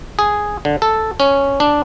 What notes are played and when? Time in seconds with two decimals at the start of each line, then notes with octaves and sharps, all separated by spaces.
0.19 G#4
0.65 D3
0.82 A4
1.20 C#4
1.60 D4